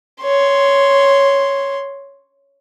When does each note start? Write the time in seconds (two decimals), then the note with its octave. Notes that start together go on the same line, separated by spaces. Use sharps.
0.23 C#5 C6